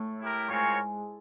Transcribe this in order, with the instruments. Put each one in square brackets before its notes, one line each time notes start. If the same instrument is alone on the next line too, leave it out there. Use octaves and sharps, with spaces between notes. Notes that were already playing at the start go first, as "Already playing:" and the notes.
Already playing: [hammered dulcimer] A2 A3
[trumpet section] E4 G4 A#4
[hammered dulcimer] G#2 G#3 [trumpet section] C4 F4 A#4 C#5